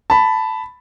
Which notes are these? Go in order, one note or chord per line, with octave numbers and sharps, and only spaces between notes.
A5 B5